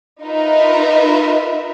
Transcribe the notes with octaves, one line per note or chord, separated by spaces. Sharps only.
D#4 F4 A#4 B4 D#5 E5